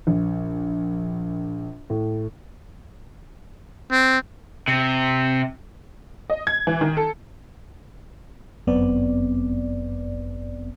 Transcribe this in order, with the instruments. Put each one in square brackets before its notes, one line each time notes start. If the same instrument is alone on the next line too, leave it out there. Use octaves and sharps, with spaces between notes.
[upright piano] A#1
A2
[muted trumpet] C4
[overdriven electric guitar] C3
[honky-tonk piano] D#5
G#6
E3
D#3
A4
[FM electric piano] G1 F#2 B3 C4 D5